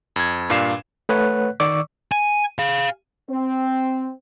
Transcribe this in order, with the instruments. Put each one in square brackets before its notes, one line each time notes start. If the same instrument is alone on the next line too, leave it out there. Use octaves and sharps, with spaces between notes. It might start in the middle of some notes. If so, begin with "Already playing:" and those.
[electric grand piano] F2 G#6
G2 A#2 D4 F5 C7 E7
[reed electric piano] A3 B4 C#5 F#5 F#6
D#3 D5 C#6 D6 E6
[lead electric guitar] G#5
G#4 F5
[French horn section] C4